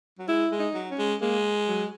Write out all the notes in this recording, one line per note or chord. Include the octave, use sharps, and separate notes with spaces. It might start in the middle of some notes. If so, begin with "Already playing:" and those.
F#3
G#3 E4
G#3
D#4
F#3
C#4
G#3
G#3 A#3
F#3